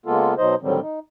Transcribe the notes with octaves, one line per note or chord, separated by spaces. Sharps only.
C#3 G#3 A#3 B3 F4 A4
B2 F#3 D#4 C5 D#5
A2 D3 D#3 F#3 G3 C4
D#4